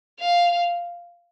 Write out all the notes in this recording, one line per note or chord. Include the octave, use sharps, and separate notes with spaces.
F5